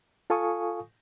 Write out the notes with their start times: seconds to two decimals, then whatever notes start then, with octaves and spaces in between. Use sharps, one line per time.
0.30 F4 A4 F5 G#5 C#6 D#6